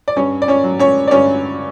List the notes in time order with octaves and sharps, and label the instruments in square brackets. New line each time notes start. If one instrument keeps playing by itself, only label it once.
[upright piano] D5
G2 C#4 C#5
D5
C#4 C#5
F#3
C#4 C#5
D5
G2 C#4 C#5